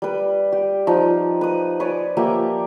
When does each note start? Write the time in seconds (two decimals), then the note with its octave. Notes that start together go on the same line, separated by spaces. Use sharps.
0.02 G3 B4
0.52 G4
0.87 F3 D#4
1.41 B4 D#6
1.80 B4 C#5 D5 G#5
2.17 F3 A#3 G4 E5